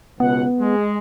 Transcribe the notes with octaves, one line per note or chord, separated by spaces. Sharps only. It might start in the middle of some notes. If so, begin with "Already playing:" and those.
C#2 B2 B3 F#5
G#3